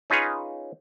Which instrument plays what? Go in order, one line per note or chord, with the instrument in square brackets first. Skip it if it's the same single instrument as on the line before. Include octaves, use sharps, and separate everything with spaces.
[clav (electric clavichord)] C#4 D#4 F4 G#4 B4 C#5